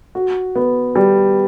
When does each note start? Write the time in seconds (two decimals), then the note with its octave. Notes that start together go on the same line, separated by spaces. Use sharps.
0.15 F#4
0.55 B3
0.96 G3